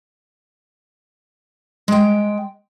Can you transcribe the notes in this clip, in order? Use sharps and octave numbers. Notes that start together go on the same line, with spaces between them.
G#3 G5